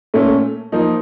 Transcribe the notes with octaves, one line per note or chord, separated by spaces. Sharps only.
A#2 A3 C#4
F3 A#3 D#4